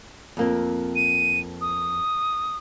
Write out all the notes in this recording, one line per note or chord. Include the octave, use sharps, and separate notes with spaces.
F2 A#3 C4
D#7
D#6